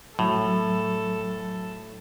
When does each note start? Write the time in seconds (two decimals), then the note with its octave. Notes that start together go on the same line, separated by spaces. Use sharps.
0.19 A2 F#3 A4